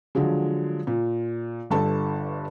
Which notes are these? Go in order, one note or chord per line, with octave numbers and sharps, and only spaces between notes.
D3 F3 F#3 G#3
A#2
G1 G2 A4 A5